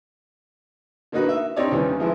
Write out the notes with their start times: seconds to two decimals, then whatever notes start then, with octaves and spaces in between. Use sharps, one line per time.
1.12 D3 A#3 D#4 F#4 B4
1.29 E5
1.56 C4 D4 D#4 G4 C#5 D5
1.71 D#2 D#3 E3 G3 C#4
2.00 E3 F3 G#3 E4